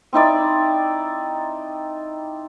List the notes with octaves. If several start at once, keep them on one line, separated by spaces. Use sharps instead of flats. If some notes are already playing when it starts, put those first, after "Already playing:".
C4 D#4 E4 D5